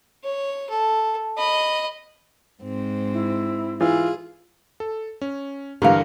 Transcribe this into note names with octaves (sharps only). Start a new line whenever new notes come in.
C#5
A4
D#5 B5
G#2 C4
E4
E3 F4 G#4
A4
C#4
G2 D3 E3 A#4 F5